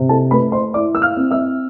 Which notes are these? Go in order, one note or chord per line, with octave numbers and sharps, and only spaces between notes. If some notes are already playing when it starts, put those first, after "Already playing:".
Already playing: C3
A4 A5
A3 B4 B5
C5 C6
E4 D5 D6
E6
F5 F6
C4
E5 E6